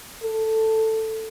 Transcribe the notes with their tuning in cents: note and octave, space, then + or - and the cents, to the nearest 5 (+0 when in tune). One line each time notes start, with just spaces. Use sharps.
A4 +5